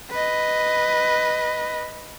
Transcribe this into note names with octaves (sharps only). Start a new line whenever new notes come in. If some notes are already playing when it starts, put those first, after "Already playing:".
B4 D#5